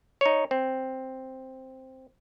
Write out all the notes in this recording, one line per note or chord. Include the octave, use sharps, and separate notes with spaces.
D#4 C#5
C4